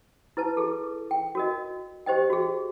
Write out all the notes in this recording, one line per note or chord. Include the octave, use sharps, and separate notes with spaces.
E4 B4 A5
G#4 A4
G5
F#4 A#4 D#5
G4 C5 D#5 G5
F#4 G#4